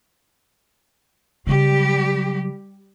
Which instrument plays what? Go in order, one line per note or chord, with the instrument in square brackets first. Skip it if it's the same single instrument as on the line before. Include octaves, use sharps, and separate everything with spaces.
[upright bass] C#3 F#3 [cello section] G3 G4